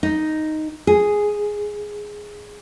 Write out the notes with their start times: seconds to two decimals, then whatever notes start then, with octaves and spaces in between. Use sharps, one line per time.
0.03 D#4
0.87 G#4